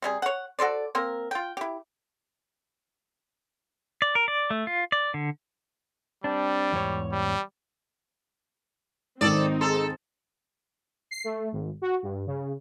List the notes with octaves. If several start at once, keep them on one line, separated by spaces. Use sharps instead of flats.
C3 G3 G#4
C#5 F#5
F#4 A4 C5 D5
A#3 C4 A#4
F4 G5
E4 G4
D5
A#4
D5
A3
F4
D5
D3
G3 C4 D4
E2 G#2 C#5
G3
G#2 D#3 C4 D#4 A4 D5 D#6
G#4 A4 A#5 C6
C7
A3
G#1
F#4
G2
C#3